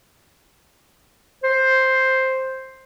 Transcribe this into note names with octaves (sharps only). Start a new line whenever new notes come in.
C5